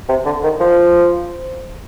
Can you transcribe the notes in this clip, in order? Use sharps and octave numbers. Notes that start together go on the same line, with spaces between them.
C3
D3
D#3
F3